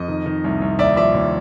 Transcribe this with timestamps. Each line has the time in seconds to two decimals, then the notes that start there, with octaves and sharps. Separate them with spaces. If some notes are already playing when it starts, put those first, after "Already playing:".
Already playing: F2 D#5
0.08 D#3
0.26 D#3
0.44 C2
0.62 C2
0.79 D#2 D5 E5
0.96 F3 D5 E5
1.14 D#2